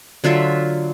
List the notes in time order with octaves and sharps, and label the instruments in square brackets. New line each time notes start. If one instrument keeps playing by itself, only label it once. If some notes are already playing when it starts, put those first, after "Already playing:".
[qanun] D3 F#3 F4 E5